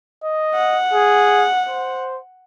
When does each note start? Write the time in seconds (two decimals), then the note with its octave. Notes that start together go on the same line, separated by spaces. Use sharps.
0.24 D#5
0.55 F#5
0.93 G#4
1.68 C5